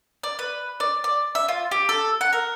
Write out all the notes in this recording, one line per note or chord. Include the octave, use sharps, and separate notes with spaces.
D5
B4
D5
D5
E5
F4
G4
A4
F#5
A#4